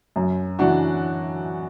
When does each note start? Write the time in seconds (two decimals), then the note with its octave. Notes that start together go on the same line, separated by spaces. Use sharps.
0.16 F#2
0.59 E3 D4 F#4